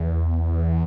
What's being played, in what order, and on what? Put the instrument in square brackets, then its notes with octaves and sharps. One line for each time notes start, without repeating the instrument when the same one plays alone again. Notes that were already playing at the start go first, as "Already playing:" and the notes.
Already playing: [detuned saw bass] E2